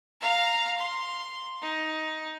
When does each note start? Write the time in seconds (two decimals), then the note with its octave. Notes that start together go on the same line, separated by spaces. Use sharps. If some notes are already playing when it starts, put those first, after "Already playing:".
0.21 F5 A#5
0.78 C6
1.62 D#4